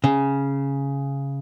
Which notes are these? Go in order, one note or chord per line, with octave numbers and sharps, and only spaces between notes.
C#3